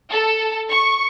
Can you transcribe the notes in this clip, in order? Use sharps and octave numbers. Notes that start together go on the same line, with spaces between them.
A4
C#6